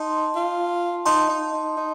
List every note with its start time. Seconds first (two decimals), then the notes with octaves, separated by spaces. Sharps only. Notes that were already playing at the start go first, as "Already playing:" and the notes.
Already playing: D#4 A5 C6
0.36 F4
1.05 D#4 A5 C6
1.29 D#4
1.53 D#4
1.77 D#4